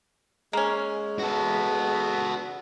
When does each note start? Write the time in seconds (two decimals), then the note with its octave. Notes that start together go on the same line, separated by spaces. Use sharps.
0.53 G#3 A#3 C#4
1.19 B3 F#4 A4